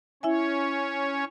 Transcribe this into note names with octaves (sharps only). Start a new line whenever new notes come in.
C#4 E4 C#5 E5 G#5